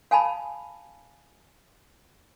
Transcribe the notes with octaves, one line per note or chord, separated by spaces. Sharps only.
F5 G#5 A5 B5